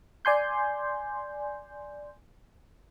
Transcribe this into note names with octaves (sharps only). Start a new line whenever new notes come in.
D5 G#5 C6 G6